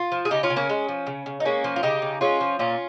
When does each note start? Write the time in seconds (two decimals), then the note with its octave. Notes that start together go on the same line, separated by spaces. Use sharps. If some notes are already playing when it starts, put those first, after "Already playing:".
Already playing: F4
0.12 F3
0.25 G#4
0.31 C#3 D#4 G4
0.43 C#4 F4
0.50 C#3
0.56 A#3 C#4
0.70 G#3
0.89 F3
1.07 C#3
1.26 C#3
1.40 D#4
1.45 G#3 A#3 C#4
1.64 F3
1.76 F4
1.83 C#3 D#4 G4
2.02 C#3
2.21 G#3 C#4 F4
2.41 F3
2.59 A#2 C#4 F4